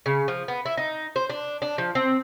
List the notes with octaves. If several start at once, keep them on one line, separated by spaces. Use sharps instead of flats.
C#3
F3
B3
E4
D#4
C5
D4
D4
F3
C4